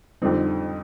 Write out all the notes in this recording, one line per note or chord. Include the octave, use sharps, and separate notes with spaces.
F2 D3 G3 C4 D#4